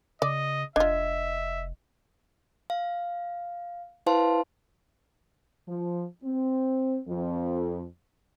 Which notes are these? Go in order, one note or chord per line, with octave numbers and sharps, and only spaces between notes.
C#3 D5 D#5
F1 D4 F4 D#5 E5
F5
E4 B4 C5 F5 A5 C6
F3
C4
F2